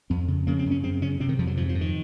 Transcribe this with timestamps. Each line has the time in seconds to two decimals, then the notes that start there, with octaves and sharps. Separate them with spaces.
0.10 F2 C4
0.28 C#3
0.47 C#3 A#3
0.59 C4
0.66 F#2
0.71 C#4
0.84 C#3 C4
1.02 C#3 C#4
1.20 C3 C4
1.29 D#3
1.39 F2 F3
1.47 F#3
1.57 G#2 F3
1.69 F3
1.75 G#2
1.81 D#3